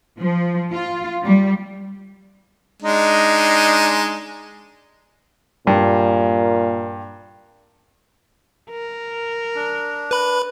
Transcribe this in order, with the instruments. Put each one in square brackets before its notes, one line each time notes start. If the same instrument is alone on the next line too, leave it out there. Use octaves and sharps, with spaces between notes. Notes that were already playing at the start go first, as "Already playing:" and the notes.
[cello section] F3
F4
G3
[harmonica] G#3 D4 D#4
[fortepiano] G2 [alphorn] A#2
[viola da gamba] A#4
[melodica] D4
[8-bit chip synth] B4 B5